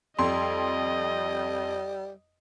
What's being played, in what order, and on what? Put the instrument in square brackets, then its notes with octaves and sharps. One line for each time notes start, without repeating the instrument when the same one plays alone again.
[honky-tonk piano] F2 C6 [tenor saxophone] G3 [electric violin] D#5